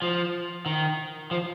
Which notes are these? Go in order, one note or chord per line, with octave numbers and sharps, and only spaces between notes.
F3
D#3
F3